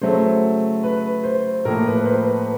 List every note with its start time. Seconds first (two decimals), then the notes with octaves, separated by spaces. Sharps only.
0.01 C#3 F#3 A3 C5
0.83 B4
1.24 C5
1.65 A2 F3 A#3 A#4
1.86 B4
2.01 B4
2.06 C5
2.26 B4